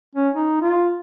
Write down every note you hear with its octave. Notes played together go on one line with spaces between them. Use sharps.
C#4
D#4
F4